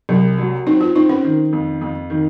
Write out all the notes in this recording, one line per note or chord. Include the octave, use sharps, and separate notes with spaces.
C2 F#3
F#3
C4 D#4
F4
C4 D#4
C#4
D#3
F2
F2
D#3